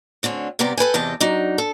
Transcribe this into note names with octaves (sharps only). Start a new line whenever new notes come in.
D2 D3 C4 C#4
G2 C3 B3 G4 A#4 D5
A4 B4 G5 G#5
E2 C3 E3 D#5 G5 A5
F#3 D4 D#4
A4